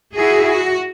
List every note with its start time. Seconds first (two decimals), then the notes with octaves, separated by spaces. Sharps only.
0.14 E4 F#4 G#4
0.49 F#4